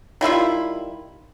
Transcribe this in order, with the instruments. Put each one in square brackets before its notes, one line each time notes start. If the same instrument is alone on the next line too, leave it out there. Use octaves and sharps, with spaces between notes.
[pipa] D#3 G3 E4 F4